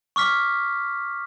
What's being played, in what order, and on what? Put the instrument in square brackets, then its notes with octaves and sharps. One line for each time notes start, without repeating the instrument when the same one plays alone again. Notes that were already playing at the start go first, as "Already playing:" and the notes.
[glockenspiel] C#6 D6 F6 B6